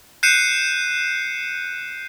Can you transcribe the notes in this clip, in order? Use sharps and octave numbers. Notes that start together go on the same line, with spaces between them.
F#6 G6 C7 C#7 D#7 E7